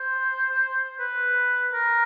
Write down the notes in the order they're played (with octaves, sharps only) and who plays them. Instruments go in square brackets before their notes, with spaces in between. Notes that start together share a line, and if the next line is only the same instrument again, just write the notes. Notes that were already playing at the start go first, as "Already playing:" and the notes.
Already playing: [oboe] C5
B4
A#4